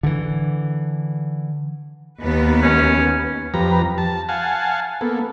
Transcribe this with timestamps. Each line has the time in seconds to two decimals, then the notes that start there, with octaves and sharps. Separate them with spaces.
0.03 D3 E3
2.20 D#2 B3 B4
2.63 C#4
3.54 F2 F3 G4 B4 A#5
3.98 A5
4.29 F5 F#5 G#5 A5
5.01 A#3 B3 A4